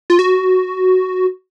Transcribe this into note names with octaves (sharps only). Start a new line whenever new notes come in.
F4
F#4